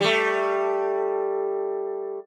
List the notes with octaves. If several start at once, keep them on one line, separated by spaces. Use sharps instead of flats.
G3 A3